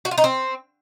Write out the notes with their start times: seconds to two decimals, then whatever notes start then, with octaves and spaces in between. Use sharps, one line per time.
0.05 F#4
0.11 F4
0.18 D#4
0.24 C4